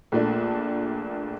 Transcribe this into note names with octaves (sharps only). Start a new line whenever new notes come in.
A#1 A#2 A3 D4